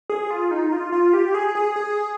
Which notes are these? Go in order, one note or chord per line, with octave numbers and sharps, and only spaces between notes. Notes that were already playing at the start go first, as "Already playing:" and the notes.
G#4
F4
D#4
F4
F4
G4
G#4
G#4
G#4